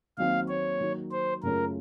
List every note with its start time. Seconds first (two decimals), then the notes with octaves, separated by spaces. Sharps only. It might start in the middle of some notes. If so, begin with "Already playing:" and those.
0.17 D#2 D#3 F#3 C4 F5
0.48 C#5
0.80 D#3 F#3 A#3
1.11 C5
1.43 F#2 C#3 A3 C#4 F4 A#4